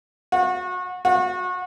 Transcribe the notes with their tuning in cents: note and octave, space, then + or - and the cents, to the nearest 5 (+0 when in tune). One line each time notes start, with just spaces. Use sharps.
F#4 -30
F#4 -30